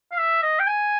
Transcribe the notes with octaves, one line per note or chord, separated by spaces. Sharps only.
F5
E5
D#5
G5
G#5